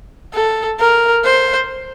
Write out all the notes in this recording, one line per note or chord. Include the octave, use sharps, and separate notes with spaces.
A4
A#4
C5